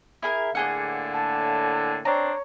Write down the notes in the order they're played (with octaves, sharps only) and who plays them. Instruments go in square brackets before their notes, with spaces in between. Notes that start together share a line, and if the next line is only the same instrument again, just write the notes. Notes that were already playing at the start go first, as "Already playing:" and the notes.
[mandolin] E4 G#4 A#4
[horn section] A2 D3 [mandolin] A#3 G#4 F#5
[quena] A5
[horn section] C4 D4 [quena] C#5 [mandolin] A#5